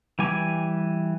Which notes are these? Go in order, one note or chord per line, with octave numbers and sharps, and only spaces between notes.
E3 G3 G#5 D6